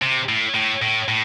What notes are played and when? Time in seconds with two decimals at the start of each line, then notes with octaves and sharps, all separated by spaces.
0.02 C3
0.29 A2
0.55 A2
0.82 A2
1.08 A2